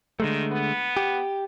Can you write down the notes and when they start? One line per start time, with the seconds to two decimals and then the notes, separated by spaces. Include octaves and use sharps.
0.20 D3 D#3 G#3 A3
0.52 B3
0.97 G4